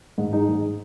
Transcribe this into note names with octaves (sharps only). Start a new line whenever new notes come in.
G#2
G#3 D#4
G#2